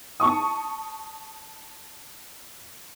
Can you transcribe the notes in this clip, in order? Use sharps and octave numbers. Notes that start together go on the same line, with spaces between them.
A5 C#6 D#6